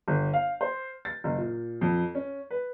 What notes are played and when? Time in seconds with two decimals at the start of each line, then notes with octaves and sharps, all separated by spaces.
0.08 G1
0.34 F5
0.61 C5
1.05 A6
1.24 F#1
1.38 A#2
1.81 F2
2.15 C#4
2.51 B4